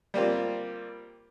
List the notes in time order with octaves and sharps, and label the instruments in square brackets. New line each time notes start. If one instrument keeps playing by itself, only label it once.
[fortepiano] G3 A#3 C4 F4